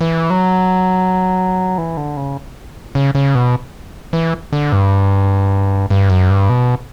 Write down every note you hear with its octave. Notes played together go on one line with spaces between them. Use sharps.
E3
F#3
E3
D3
C#3
C#3
C#3
B2
E3
D3
G2
G2
F#2
G2
B2